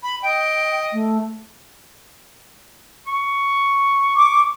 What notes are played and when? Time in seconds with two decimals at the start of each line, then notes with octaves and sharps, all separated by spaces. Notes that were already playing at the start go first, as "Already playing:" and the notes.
0.03 B5
0.23 D#5 G5
0.93 A3
3.07 C#6
4.15 D6